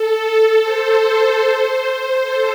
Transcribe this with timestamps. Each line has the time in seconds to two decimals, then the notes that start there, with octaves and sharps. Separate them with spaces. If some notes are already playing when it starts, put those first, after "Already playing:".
Already playing: A4
0.62 C5
1.43 C5
2.23 A4